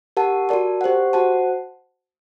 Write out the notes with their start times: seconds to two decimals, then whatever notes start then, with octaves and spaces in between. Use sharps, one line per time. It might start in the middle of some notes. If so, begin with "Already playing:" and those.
0.17 G4 A#4 F#5 A5
0.49 F#4 A#4 D5 A5
0.81 G4 C5 F#5
1.13 F#4 C5 F#5 A5